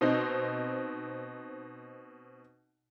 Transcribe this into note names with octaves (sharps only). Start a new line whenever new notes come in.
B2 C4 D#4